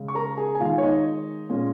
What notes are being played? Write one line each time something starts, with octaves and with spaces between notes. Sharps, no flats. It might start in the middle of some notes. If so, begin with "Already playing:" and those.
Already playing: C#3 G#3 C#4
C#6
A#4 A#5
G#4 G#5
G#5
D#3 G#3 D#4 F4 F5
C#5
D#4 D#5
A#2 G#3 C#4